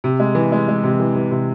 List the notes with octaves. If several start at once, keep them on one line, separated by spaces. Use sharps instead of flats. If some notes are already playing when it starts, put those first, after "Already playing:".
C3
G#3
E3
G#3
G#3
C3
E3
E3
C3